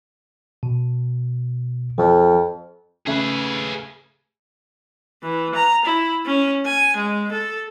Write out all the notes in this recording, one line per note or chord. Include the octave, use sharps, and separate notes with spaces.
B2
F2 F3
C#3 A3 G#4 B4
E3
A#5
E4
C#4
G#5
G#3
A4